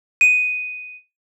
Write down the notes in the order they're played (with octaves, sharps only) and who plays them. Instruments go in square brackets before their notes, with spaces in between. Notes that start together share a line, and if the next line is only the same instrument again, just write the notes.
[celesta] D#7